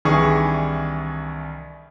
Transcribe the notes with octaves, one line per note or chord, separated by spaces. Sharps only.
C2 D#3 E3 D4 G#4 C#6